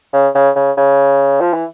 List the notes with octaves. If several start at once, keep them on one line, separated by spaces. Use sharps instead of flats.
C#3
C#3
C#3
C#3
F3
E3